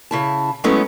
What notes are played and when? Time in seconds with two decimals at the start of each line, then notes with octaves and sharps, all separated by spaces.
0.11 C#3 E4 A5
0.64 F#3 G#3 A3 B3 C#4 E4